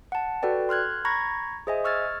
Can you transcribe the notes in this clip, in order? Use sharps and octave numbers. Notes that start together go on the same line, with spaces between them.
F#5 A5
F#4 A4 B4 D5 G5
C6 F6 F#6 G#6
A#5 B5 C#6 G#6 A#6
G#4 C5 D#5 E5 G#5
C#6 E6 F6 G#6 A6